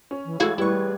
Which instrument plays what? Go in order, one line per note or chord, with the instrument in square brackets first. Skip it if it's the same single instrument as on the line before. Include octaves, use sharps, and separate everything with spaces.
[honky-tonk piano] C#4
[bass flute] E3
[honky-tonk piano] A1 G#3 G#6 [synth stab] E4 F#4 F5 [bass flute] A4
[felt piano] G3 [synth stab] E4 C#6 [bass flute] B4